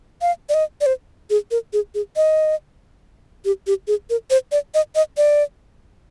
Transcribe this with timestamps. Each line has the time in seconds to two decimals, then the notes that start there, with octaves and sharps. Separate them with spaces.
0.22 F5
0.49 D5
0.54 D#5
0.81 D5
0.86 C5
1.30 G#4
1.51 A#4
1.73 G#4
1.95 G#4
2.16 D#5
3.45 G4
3.67 G4
3.88 G#4
4.10 A#4
4.30 C5
4.52 D5
4.74 D#5
4.95 D#5
5.17 D5